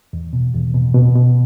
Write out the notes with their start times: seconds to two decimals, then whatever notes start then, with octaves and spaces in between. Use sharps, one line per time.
0.13 E2
0.33 B2
0.54 E2
0.75 B2
0.95 B2
1.15 B2